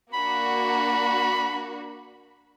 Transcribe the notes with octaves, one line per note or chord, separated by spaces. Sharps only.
A#3 D4 F#4 B5